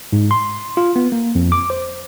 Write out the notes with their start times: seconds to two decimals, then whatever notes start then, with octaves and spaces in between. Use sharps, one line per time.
0.13 G#2
0.31 C6
0.77 F4
0.96 B3
1.12 A#3
1.35 F2
1.52 D6
1.70 C5